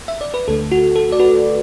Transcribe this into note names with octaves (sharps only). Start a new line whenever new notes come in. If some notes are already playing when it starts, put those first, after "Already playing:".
E5
D5
B4
D2 D3 A3 A4
F#4
A4
D5
F#4 B4